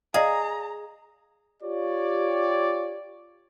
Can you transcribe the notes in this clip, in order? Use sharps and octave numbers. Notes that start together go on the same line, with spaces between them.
G#4 D5 D#5 F5 A#5
F4 G4 C#5 D5